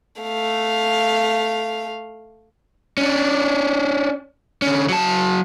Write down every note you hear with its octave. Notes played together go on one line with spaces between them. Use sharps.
A3 F5
C#4 D4
D3 C#4
F#3 A5